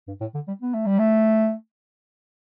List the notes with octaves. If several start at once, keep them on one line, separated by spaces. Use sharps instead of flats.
G2
A2
D3
G3
B3
A3
G3
A3